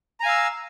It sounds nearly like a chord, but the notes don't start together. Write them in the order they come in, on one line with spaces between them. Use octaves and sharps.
A#5 G#5 F5 E6